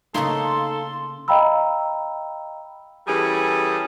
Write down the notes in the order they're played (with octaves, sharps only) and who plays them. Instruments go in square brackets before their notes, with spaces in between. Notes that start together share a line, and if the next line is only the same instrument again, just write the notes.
[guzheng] C#3 A3 A#3 [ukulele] D#4 [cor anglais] A4 [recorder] C6
[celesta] D#5 F5 G5 A#5 B5 E6
[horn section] E3 G3 C#4 G#4 A4